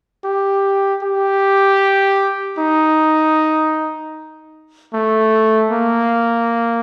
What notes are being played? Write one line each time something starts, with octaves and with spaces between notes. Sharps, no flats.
G4
G4
D#4
A3
A#3